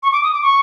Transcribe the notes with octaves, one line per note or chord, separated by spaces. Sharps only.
C#6
D6
D#6
D6
C#6